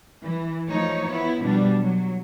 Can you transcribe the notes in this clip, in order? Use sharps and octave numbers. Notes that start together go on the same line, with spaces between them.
E3
F3 A3 D#4 C#5
B3 E4
B2 F3 G3 D4
F#3